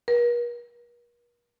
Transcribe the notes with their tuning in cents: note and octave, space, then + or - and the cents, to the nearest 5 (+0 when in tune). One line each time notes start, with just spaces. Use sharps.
A#4 +45